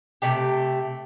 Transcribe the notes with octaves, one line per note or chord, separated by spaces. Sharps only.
C3 A3 G4